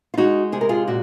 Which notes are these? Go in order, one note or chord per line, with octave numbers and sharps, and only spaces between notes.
F4
G#3 D#4 F#4
C3 G#4
A#4
F4 G#4
A#2 F#4